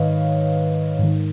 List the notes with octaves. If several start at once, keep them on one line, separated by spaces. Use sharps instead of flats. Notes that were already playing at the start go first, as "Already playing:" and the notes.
Already playing: G#2 D#3 B4 C#5 D#5 F5
G#2 D#3